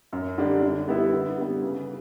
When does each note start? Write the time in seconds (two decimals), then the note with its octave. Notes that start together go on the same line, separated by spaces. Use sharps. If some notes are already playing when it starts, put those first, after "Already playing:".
0.13 F#2
0.38 D3 G3 D4
0.63 D3
0.87 G3 B3 E4
1.13 D3
1.37 G3 B3
1.62 C#3